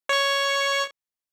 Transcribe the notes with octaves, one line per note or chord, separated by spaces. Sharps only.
C#5 C#6